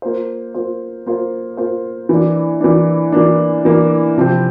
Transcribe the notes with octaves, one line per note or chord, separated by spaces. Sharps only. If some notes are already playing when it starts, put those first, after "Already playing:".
A#3 F4 C5
A#3 F4 C5
A#3 F4 C5
A#3 F4 C5
E3 A#3 D4
E3 A#3 D4
E3 A#3 D4
E3 A#3 D4
C3 F3 C4